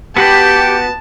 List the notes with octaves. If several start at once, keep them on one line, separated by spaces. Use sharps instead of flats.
B3 F#4 G4 A5 B5